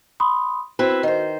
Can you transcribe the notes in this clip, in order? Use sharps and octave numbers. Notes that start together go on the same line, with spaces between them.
B5 C6 D#6
C4 E4 F#4 B4
D#3 C5